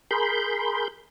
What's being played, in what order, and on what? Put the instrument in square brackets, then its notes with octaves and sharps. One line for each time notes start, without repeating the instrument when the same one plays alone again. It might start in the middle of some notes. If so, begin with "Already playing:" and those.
[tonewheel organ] G#4 A#4 B5 C6 G6